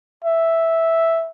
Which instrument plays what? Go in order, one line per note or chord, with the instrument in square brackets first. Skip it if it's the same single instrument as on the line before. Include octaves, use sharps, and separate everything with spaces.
[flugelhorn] E5